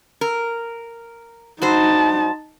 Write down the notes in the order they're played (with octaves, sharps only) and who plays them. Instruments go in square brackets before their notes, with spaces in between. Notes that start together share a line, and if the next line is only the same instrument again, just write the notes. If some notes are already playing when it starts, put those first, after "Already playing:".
[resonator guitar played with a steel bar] A#4
[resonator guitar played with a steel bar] G2 F#4 C5 [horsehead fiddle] D#4 A5